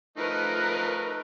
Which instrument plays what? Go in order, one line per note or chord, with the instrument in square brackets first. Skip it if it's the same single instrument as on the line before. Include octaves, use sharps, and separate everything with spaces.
[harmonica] F3 A3 D#4 [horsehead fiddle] A#4 B4